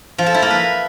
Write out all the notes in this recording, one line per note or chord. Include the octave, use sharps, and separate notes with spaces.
F3
A4
E4
A#3
B4